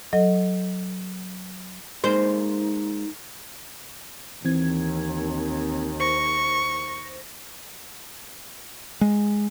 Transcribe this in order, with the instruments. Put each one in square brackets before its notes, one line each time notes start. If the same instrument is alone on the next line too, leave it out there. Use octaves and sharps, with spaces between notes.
[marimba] F#3 A4 D#5
[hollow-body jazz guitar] G#3 A#3 [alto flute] D#4 [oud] C5
[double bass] D#2 [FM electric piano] E3 C4 G#6
[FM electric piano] C5 A#6 [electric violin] C#6
[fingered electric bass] G#3